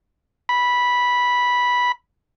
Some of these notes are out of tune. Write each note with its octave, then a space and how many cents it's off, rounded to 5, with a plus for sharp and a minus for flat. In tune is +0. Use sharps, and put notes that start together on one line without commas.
B5 -10